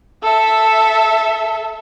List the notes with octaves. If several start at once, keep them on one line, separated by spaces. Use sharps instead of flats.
A4 E5